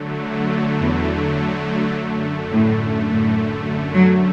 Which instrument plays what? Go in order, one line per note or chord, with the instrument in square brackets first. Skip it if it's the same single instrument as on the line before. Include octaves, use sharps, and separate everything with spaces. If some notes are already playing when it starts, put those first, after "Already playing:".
Already playing: [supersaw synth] D3 F#3 A3
[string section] E2
[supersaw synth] F#2 D3 A3
[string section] A2
A2
F#3